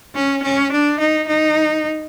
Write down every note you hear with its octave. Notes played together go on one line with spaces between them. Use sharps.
C#4
C#4
D4
D#4
D#4